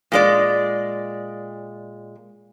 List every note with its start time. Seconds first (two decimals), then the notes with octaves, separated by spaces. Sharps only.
0.12 A#2 G#3 D5